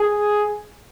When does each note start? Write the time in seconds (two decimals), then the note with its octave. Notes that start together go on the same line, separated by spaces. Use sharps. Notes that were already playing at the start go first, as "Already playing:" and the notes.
Already playing: G#4